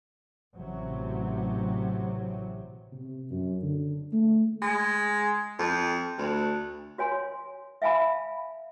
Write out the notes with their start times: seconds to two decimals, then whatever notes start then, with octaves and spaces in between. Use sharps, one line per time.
0.54 A1 C3 F#3
2.92 C3
3.31 F#2
3.62 D3
4.13 A3
4.62 G#3
5.59 F2
6.18 D2
6.98 F#4 C#5 G#5 C6
7.82 E5 F5 G#5 A5 B5